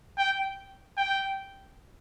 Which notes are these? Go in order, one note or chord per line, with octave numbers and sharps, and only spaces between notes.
G5
G5